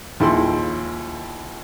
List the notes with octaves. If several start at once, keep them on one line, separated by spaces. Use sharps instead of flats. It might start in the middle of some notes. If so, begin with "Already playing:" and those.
D#2 F3 E4 G#4 C6